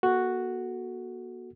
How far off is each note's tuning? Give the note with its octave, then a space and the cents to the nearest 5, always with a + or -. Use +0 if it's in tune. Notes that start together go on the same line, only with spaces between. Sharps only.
A#3 +45 F#4 +0 A4 +0